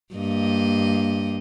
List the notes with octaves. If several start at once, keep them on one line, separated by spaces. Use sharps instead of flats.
G2 A#3 D#5